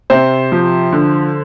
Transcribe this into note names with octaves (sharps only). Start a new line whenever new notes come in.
C3 C5
F3
D3